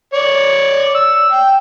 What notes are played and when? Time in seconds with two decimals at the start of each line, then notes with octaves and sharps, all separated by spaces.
0.14 C#5 D5
0.95 E6
1.32 G5